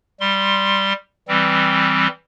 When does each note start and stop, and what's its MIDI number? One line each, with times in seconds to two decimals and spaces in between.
0.20 0.93 55
0.20 0.93 84
1.28 2.07 52
1.28 2.07 55
1.28 2.07 60